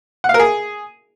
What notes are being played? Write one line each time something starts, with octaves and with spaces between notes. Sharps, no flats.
F#5
F5
A#4
G#4